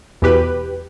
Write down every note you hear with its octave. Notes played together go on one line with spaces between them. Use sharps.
E2 B2 G4 B4